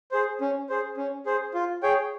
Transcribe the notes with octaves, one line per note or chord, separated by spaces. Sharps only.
G#4 C5
C#4
G#4 C5
C#4
G#4 C5
F4
G#4 C#5 G5